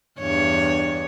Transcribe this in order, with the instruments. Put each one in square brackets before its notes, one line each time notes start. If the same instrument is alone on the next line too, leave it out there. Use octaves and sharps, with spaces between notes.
[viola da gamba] E2 G2 C#5